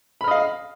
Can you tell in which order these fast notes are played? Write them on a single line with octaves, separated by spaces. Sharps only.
B5 F6 D#5 F5